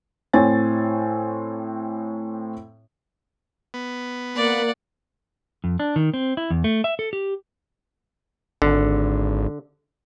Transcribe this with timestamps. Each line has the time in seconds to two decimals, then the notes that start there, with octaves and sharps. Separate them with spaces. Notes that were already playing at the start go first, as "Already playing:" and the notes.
0.33 A2 C4 C#5 G#5 A6
3.74 B3
4.36 A#3 D5 F#5
5.64 F2
5.80 D4
5.96 D#3
6.14 C4
6.37 E4
6.51 E2
6.64 A3
6.84 E5
6.99 A4
7.13 G4
8.62 G#1 D3